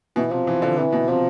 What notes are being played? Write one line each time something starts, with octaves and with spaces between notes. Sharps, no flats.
B2 E3
C3 F3
E3
D3
C3 E3
B2
C3 F3